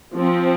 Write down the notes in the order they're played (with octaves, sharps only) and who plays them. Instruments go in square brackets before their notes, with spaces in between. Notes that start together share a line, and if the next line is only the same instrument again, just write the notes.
[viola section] F3 C4